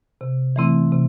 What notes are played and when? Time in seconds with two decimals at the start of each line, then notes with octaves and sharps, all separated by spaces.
0.21 C3
0.56 E3 A3 C4 E4
0.92 C3